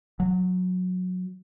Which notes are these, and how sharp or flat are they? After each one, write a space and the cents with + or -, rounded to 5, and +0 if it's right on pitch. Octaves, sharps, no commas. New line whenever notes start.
F#3 -20